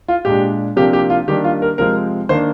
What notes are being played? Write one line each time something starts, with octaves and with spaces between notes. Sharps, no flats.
F4
A#2 G#3 D4 G4
C3 F3 A#3 D4 G4
G4
F4
D#3 G3 A#3 D4 G4
F4
A#4
C3 F3 G#3 C4 A#4
D#3 A#3 D4 C5